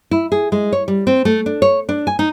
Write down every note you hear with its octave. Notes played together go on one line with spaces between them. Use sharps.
E4
G#4
G#3
C#5
G3
C4
A3
D4
C#5
D4
G#5
D#4